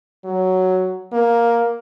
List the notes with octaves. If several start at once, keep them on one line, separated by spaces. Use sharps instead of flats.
F#3
A#3